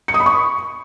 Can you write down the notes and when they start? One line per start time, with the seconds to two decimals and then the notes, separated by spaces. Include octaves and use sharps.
0.08 C#7
0.14 D#6
0.20 B5
0.26 C#6